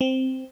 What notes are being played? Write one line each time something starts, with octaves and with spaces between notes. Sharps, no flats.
C4